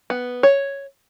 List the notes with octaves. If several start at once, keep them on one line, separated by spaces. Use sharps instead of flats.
B3
C#5